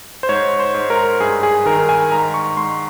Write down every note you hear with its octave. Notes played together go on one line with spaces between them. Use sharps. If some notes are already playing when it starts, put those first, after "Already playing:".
C5
G#2 C#5
C5
G#2
A#4
G2 G#4
G#4
D#3 A#4
G#5
G#2 A#5
C#6
G#2 C6